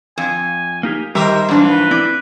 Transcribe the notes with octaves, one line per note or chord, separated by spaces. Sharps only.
F2 G#5
A#3 D#4 G4
D#3 G3 G4 A#4 C5 E5 A#5
G#2 E3 F3 D4
B4
C4 E4 D5